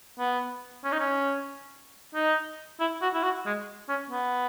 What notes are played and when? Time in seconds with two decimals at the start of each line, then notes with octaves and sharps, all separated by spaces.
0.19 B3
0.84 C#4
0.92 D#4
0.99 C#4
2.14 D#4
2.80 E4
3.02 F#4
3.14 E4
3.23 F#4
3.46 G#3
3.89 C#4
4.10 B3